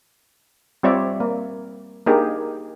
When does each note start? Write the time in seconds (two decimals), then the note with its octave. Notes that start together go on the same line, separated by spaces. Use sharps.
0.83 G3 C4 F4 C#5 D5 E5
1.20 A#3
2.06 A#3 D4 D#4 G4 G#4 A#4